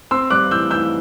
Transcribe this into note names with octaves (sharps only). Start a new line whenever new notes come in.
C4 C6 E6
G3 D6 F#6
E3 E6 G6
E3 E6 G6